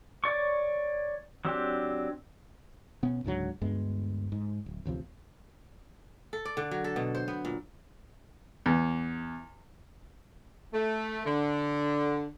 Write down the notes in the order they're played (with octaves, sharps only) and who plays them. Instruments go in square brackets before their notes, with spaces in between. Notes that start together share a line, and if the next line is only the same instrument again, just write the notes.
[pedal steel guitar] C#5 D5 C#6
F#3 C4 D4 G4
[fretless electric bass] B2 B3 C#4
C#2 G#2 D3 F#3
D2 G2 G#3 B3
G#2
D1
A1 D2 C3 F3
[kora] A4
D5
D3
F#3
A4
B2
C5
B3
A#2
[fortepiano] E2
[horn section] A3
D3